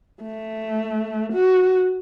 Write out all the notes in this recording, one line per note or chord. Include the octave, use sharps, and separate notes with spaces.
A3
F#4